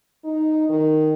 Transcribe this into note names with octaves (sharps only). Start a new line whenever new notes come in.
D#4
D#3